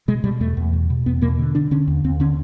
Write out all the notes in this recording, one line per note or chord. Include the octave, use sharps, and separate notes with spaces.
B2 G#3
B2 G3
E2 A3
E2
B2
B2
E2 B3
B2 A#3
D3
D3 D4
D3 C#4
D#2
D#2 C4
D3 C#4